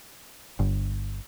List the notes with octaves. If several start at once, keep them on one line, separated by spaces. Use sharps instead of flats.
G1